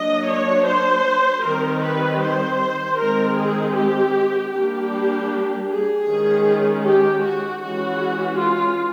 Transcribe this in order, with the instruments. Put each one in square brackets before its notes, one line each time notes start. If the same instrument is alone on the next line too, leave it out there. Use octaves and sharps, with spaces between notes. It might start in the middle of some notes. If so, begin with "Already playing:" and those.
Already playing: [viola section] F#3 A#3 D4 D#5
C#5
C5
D#3 G3 C4 A#4
B4
C5
D#3 G#3 C4 A#4
G#4
G4
G3 A#3 D4 G4
G#4
D#3 G#3 C#4
G4
F#4
E3 G#3 C#4 F#4
F4